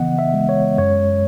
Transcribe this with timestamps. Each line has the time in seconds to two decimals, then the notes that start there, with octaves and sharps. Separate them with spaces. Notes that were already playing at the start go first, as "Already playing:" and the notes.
Already playing: C#3 E3 B3 D#5 F#5
0.19 E5
0.34 G#3
0.49 C#5
0.78 F#2 C#5